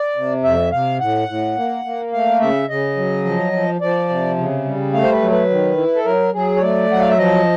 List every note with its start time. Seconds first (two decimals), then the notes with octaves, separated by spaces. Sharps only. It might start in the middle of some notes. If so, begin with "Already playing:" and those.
Already playing: D5
0.16 C3
0.44 F2 E5
0.72 C3 F5
1.00 A2 F#5
1.28 A2
1.56 A#3
1.85 A#3
2.13 A3 F5
2.40 C#3 E5
2.69 C#3 D#5
2.97 F#3
3.25 F3
3.52 F3
3.81 F3 D5
4.09 C3
4.37 C#3
4.65 G3
4.93 A3 F5
5.03 C5
5.12 B4
5.21 F#3
5.31 B4
5.50 D#3
5.77 E4
5.95 A4
6.05 F#3 A#4
6.34 F#3 G#4
6.56 C#5
6.61 A3 D5
6.90 F#3 F#5
7.00 F5
7.09 E5
7.18 F3 D#5